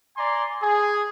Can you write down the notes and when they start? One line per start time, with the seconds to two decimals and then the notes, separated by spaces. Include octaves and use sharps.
0.17 D5 G#5 A#5 C6
0.62 G#4